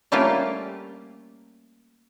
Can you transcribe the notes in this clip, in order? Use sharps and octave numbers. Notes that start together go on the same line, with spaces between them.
G3 A3 A#3 C#4 F4 G4